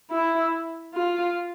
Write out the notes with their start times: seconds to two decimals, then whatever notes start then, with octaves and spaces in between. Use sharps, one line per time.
0.11 E4
0.94 F4